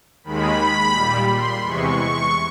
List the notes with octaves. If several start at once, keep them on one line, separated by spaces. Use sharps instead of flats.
D#2 D#3 G#3 B5
A#2 G3
C6
E2 C3 E3 G#3 C#6